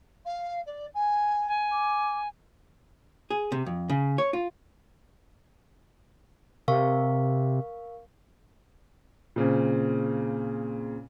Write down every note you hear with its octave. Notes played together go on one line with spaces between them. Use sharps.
F5
D5
G#5
G#5
D6
G#4
C3
F2
C#3
C#5
F4
C3 A#4 F5 C#6
A#2 C#3 C4